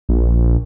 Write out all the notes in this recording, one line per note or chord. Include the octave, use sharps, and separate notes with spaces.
A#1